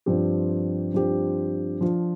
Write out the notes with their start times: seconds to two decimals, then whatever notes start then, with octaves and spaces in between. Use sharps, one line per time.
0.06 G2 F3 C4 G4
0.94 G2 F3 C4 G4
1.81 F3 D4 F4